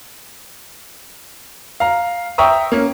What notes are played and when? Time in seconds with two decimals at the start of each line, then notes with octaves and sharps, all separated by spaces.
1.80 F5 A#5
2.38 E5 G5 A#5 C#6 D#6
2.72 A#3 C#4